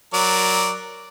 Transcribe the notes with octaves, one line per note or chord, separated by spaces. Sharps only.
F#3 A#4 D5